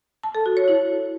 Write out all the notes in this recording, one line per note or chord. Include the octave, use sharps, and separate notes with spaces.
A5
A4
F#4
C#5
E4